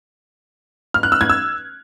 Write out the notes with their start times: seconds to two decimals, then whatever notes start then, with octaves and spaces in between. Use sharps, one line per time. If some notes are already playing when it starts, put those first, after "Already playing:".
0.94 F6
1.03 F#6
1.12 E6
1.21 G#6
1.30 E6